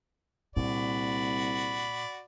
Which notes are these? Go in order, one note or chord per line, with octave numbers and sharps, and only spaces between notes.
C2 A#2 F#4 D5 B5